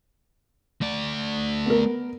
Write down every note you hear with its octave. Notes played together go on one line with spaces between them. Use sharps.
A3 D5
B3 A#4